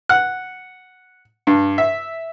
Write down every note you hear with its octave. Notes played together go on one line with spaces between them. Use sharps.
F#5
G2
E5